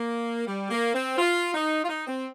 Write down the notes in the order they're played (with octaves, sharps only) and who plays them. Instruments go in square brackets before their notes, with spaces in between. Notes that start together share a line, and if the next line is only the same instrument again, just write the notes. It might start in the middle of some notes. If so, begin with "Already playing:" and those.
Already playing: [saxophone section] A#3
G3
A#3
C4
F4
D#4
F4
D#4
C4